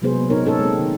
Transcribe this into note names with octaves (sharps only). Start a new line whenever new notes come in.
C3 F#3 G#3 B3 G#4 C5
A#3
A#2 C4 D#4 A#4 C#5
C#4 A4 A#4 C#5
G#3 C4
D#3